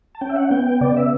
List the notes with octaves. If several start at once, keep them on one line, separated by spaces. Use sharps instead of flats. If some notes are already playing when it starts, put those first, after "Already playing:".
A5
C#4 G5
E5
F#5
B3 G5
G5
C#3 D5
E5